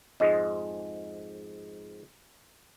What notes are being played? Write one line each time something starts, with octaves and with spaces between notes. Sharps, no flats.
F2 G#2 G#3 D#5